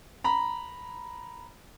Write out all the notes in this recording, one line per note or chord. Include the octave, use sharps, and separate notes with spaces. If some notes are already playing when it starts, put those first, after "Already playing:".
A#5 B5